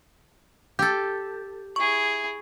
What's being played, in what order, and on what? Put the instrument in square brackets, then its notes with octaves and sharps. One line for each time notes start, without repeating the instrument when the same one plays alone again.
[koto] G4 A4 [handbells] G6 A6
[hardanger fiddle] E4 G#4 [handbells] C#6